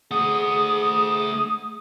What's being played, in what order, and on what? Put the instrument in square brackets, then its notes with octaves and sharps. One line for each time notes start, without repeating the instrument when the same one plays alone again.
[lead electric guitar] A3 F#5 [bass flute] G#4 [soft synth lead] D#6